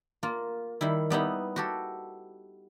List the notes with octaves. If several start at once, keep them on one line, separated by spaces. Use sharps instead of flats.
A#3 F4
D#3 G3 E4
G3 B3 D#4 E4
F#4 G4 A4